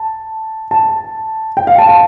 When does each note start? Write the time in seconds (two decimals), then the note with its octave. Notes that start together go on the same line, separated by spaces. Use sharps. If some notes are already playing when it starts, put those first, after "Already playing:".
Already playing: A5
0.71 A5
1.57 G5
1.67 F5
1.78 A5
1.89 A5